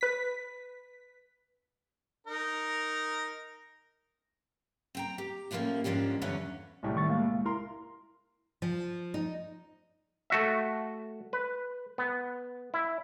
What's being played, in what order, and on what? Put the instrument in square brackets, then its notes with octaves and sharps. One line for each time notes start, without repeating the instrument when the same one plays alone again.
[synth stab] B4 B6
[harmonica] D#4 A#4
[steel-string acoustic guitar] C4 G5 A#5
G4
D#2 A2 F3 G#3 A#3 C#4
G#2 F3 C#4 D4 G4
E2 G2 D3 F#3 B3 C#4
[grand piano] C2 A2 G3
[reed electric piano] D#3 C#6 A6
G#3 A#3 F5
[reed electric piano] E4 [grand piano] A#4 C6
[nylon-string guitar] F3
D#4
[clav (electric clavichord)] A3 F#4 E5
B4
B3
E4